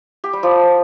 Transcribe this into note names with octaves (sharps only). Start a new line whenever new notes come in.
G4
G3
F3